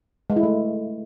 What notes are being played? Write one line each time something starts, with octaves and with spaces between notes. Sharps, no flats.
G#3
E4
A3